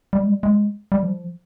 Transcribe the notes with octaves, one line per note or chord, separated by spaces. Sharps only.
G3
G#3
G3
G#3
G3
F3